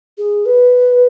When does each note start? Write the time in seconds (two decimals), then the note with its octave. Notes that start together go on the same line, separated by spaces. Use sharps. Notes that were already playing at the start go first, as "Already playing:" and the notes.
0.18 G#4
0.45 B4